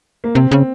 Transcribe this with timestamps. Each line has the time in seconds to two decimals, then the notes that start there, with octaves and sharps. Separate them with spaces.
0.24 A#3
0.35 C3 C4
0.51 C#3